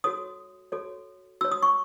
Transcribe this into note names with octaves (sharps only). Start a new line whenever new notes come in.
F#4 A4 C#5 D#6
F#4 A4 C#5
F#4 C#5 E6
D#6
C#6